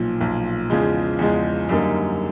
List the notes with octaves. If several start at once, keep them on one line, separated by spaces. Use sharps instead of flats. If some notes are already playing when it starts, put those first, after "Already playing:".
Already playing: B1 A#2 F3
B1 A#2 F3
E2 C#3 F3 G#3
E2 C#3 F3 G#3
F#2 D3 G3 A#3 D#4